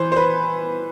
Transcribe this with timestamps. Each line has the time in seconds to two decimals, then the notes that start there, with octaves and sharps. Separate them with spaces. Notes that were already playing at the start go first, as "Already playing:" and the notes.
Already playing: E3 C5
0.12 C5
0.16 B4